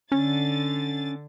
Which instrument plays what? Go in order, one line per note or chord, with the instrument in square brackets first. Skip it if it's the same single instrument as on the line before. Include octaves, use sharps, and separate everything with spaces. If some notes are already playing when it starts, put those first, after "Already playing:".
[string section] D3 A6 [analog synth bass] C#4